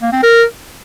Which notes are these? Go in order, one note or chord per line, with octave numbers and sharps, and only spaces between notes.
A#3
C4
A#4